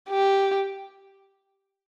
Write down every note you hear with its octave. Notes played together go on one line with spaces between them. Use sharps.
G4